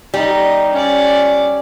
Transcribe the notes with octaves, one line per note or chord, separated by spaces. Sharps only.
G3 D#4 D#5
C#4 D5